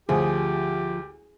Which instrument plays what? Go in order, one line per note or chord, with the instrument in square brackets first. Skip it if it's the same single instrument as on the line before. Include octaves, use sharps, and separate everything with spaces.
[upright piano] D2 [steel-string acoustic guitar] F3 [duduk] G4 [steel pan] G#4